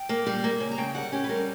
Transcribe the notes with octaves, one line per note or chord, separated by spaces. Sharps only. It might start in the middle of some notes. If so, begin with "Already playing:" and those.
Already playing: G5
A#3
G3
A#3
C#3
A#5
C#3 G5
G3 F#5
C#4 G4
B4
G3 A#4